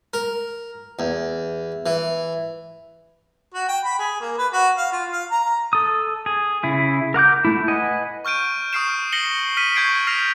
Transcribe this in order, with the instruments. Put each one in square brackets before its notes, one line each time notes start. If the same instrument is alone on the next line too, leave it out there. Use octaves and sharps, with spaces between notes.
[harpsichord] A#4
E2
E3
[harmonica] F#4
G5
B5
G#4
A#3
B4
F#4
F5
F4
F5
A#5
[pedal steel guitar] A4 D#6
G#4
C#3 E4 G#4
A#4 F#5 D6 G6
A3 E4
B4 D#5 F#5 G#5
[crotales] C#6 F6 G6 D7 D#7
C#6 D#6 F6 C7 D7 E7
A#6 C7 C#7 F#7 G7
F6 B6 C7 D#7
C#6 G6 G#6 C7 D7
F6 A#6 C7 D7 F7